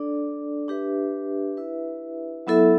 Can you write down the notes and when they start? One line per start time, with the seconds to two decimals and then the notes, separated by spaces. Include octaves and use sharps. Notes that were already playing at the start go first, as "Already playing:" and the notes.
Already playing: D4 A4 D5
0.68 D4 G4 B4 E5
1.57 E4 B4 E5
2.47 F#3 B3 E4 A4 E5